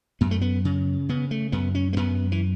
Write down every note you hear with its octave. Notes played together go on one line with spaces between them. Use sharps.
F#2 B3
A3
B3
C#3
C#3 B3
A3
F#2 B3
C#4
A3
F#2 B3
E3